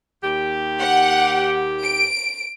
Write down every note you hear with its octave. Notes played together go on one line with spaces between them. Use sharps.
D#2 G4
F#5
D7